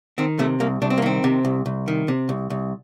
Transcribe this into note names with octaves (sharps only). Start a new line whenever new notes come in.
D#3 C4
C3 A3
C2 A#3
C2 D4
C4
A#3
D#3 C4
C3
C2
C2
D#3
C3
C2
C2